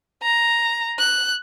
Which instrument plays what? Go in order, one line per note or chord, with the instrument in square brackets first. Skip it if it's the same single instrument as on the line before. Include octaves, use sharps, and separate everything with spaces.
[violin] A#5
F#6